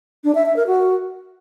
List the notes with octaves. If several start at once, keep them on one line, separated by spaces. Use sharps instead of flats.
D4
E5
E5
A#4
F#4